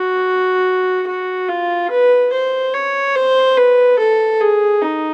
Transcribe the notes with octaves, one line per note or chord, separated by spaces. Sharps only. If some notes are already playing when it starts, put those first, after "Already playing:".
Already playing: F#4
F#4
F4
B4
C5
C#5
C5
B4
A4
G#4
D#4